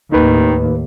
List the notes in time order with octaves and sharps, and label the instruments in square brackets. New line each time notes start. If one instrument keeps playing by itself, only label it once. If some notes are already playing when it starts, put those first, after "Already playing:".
[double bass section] D#2 A2 [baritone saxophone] D#3 [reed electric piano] D#4 B4